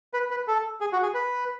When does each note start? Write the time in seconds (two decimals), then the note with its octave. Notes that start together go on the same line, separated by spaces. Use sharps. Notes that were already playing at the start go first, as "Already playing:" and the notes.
0.14 B4
0.31 B4
0.48 A4
0.81 G#4
0.93 F#4
1.03 G#4
1.14 B4